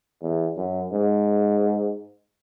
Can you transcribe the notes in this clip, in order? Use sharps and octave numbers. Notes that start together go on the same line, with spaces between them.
E2
F#2
G#2